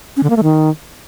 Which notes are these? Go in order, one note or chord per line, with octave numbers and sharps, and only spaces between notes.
C#4
D3
A#3
A3
D#3